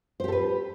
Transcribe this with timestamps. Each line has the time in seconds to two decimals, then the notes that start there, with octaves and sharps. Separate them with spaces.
0.20 C5
0.24 G4
0.28 A4
0.32 B4